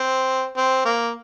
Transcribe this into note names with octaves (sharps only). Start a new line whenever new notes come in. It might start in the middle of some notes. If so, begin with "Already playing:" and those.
Already playing: C4
C4
A#3